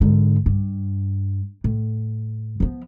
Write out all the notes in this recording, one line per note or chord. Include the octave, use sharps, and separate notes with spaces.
G#2 D3
G2
A2
F3 B3